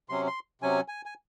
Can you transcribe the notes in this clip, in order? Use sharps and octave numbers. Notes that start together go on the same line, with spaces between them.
C3 F#3 C#4 C6
C6
C3 F#3 C#4 G#5
G#5
G#5